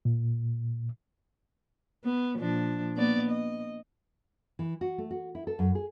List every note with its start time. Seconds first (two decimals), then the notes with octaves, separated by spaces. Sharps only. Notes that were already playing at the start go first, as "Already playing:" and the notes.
0.05 A#2
2.04 B3
2.36 A#2 F3 D4
2.96 A#3 B3 D5
3.30 D#5
4.59 E3
4.81 F#4
4.98 A3
5.11 F#4
5.35 E4
5.47 A4
5.59 F#2
5.75 G#4